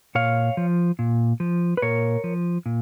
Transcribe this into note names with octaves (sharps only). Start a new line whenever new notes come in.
A#2 C#5 F5
F3
A#2
F3
B4
A#2 A#4 C#5
F3
A#2